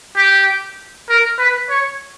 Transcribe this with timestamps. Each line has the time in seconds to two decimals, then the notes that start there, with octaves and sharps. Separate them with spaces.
0.16 G4
1.09 A#4
1.38 B4
1.69 C#5